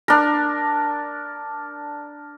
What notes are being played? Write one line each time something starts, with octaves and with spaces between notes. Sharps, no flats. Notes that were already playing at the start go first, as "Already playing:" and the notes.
D4 A#4